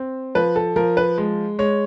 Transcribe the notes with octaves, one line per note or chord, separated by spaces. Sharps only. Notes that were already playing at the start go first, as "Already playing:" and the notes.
Already playing: C4
F3 B4
A4
F3 A#4
B4
G#3
G#3 C#5